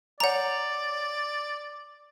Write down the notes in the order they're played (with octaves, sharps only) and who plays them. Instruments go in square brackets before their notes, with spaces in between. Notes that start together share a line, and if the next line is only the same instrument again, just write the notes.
[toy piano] C#5 G#5 [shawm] D5 [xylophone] F#5 A#5